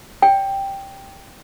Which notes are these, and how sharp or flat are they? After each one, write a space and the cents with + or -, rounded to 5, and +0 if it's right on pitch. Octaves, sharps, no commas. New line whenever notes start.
C#5 +40 G5 +0